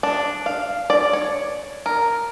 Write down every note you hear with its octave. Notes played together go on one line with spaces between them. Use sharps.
D4
F5
D5
C#5
A#4